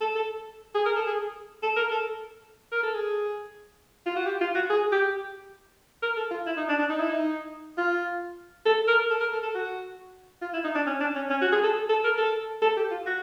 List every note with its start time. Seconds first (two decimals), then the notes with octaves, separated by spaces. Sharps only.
0.01 A4
0.15 A4
0.75 G#4
0.85 A#4
0.96 A4
1.07 G#4
1.63 A4
1.76 A#4
1.91 A4
2.72 A#4
2.83 A4
2.94 G#4
4.06 F4
4.16 F#4
4.26 G4
4.41 F4
4.55 F#4
4.70 G#4
4.92 G4
6.02 A#4
6.17 A4
6.31 F4
6.46 E4
6.57 D#4
6.69 D4
6.79 D4
6.90 D#4
7.00 E4
7.10 D#4
7.78 F4
8.66 A4
8.88 A#4
9.10 A4
9.21 A#4
9.32 A4
9.43 A4
9.55 F#4
10.41 F4
10.53 E4
10.64 D#4
10.75 D4
10.87 C#4
11.00 D4
11.15 C#4
11.30 C#4
11.41 F#4
11.52 G#4
11.63 A4
11.89 A4
12.04 A#4
12.18 A4
12.62 A4
12.77 G4
12.91 F4
13.06 F#4